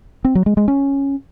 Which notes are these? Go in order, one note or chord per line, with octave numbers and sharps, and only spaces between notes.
C4
F#3
G#3
G#3
C#4